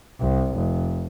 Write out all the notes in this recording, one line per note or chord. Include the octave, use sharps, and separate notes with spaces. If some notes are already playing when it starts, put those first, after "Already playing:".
C2
F1